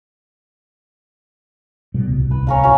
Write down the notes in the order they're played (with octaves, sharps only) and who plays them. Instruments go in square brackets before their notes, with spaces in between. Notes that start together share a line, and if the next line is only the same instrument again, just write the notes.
[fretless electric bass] B2 G3
D1 C2
[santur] B4
C#4 A#4 F5
C#4 F#4